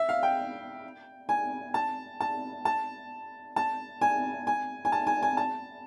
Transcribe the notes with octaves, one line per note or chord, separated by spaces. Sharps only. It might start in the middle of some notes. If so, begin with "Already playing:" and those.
Already playing: E5
F5
G5
G#5
A5
A5
A5
A5
G#5
G#5
G#5
A5
G#5
G#5
A5